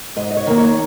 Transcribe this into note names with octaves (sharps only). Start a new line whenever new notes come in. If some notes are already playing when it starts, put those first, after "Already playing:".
G#2 D#5
D#5
C#5
D#3 A#3
C#5